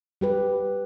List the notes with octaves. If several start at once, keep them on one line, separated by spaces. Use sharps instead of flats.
G3 G4 B4